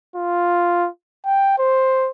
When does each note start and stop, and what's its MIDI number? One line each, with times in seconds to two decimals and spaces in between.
0.16 0.89 65
1.26 1.58 79
1.58 2.09 72